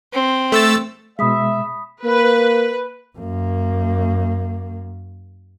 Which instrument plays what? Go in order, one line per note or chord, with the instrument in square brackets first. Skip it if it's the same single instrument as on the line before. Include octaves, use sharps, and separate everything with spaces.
[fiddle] C4
[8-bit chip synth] A3 E6 A6
[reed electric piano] B2 G#3 [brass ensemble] E5 [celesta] B5 D#6 B6
[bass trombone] A#3 [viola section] B4
[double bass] F#2 A#3